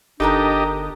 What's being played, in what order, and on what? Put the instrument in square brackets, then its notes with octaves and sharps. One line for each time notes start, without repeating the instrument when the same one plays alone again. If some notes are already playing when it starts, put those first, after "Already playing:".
[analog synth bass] G1 [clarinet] D4 [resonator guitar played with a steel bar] D#4 A4 A#4 [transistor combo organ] G4 D#5